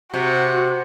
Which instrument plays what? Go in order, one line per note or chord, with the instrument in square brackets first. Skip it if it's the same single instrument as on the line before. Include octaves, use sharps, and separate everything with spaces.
[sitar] C3 [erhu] F#4